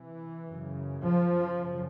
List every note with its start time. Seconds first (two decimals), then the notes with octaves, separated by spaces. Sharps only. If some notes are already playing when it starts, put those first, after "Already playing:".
Already playing: C3 E3
0.47 F#2 C#3
1.02 F3
1.56 F#2 C#3